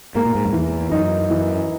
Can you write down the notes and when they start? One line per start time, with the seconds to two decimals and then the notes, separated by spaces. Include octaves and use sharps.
0.15 G#2 A#3
0.25 A#2
0.35 G#2
0.45 F#2
0.53 E2 E3
0.92 F#2 D#4
1.30 E3